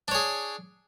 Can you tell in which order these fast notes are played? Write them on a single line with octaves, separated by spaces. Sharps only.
D4 C#5 G#4